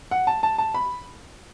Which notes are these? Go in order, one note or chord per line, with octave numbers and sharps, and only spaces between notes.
F#5
A5
A5
A5
B5